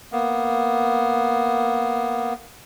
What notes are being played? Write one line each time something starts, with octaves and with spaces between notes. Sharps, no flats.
A#3 B3